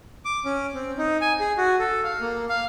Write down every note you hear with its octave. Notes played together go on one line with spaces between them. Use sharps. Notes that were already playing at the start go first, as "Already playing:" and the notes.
D6
C#4
C4
D#4
G#5
G#4
F#4
A4
F5
A#3
F5